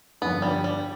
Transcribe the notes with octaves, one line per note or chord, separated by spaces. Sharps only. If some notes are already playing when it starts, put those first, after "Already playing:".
G2 D3 F3 B3
G3
G3